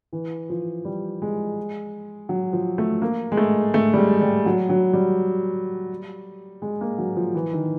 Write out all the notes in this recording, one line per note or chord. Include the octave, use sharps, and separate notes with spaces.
E3
F3
G3
G#3
F#3
F3
A3
A#3
G#3
A3
A3
G3
G#3
G3
F#3
F#3
G3
G#3
A#3
F#3
F3
E3
D#3